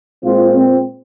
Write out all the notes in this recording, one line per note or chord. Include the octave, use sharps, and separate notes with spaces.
A#2 G#3 C4 F4
C4